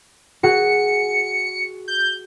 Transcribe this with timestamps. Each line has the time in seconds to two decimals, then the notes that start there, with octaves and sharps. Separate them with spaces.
0.43 F#4 G#4 C#7
1.88 G6